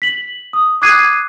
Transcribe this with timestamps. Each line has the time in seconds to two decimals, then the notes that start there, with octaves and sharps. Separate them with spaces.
0.02 B6 F#7
0.53 D#6
0.82 D6 D#6 F#6 G#6 C7 D#7